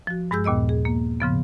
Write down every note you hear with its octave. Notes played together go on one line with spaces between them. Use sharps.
F3 F#4
G2 G#3 G#4 E6 G6
D#2 A#2 B3 D#5 E6
G#4
A#3
G#2 C#3 F3 B3